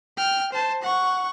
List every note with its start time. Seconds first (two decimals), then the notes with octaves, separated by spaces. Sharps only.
0.17 G5 F6
0.52 C5 A5
0.82 F#5 C#6